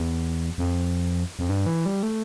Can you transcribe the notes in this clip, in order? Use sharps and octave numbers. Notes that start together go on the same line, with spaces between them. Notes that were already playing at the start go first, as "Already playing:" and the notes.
Already playing: E2
F2
F2
G2
E3
G3
A3